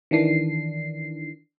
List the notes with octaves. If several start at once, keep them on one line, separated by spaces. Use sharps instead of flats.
D#3 E3 D4 C7